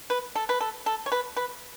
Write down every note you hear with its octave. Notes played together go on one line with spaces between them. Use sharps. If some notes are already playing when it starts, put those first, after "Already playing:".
B4
A4
B4
A4
A4
C#5
B4
B4